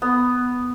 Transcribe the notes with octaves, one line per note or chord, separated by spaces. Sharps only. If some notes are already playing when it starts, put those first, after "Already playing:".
B3